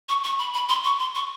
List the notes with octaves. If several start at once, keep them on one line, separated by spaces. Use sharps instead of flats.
C#6
C#6
B5
B5
C6
C#6
C6
C#6